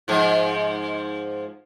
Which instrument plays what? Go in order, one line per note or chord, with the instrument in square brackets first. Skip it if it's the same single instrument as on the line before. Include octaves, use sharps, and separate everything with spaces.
[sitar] G#2 F3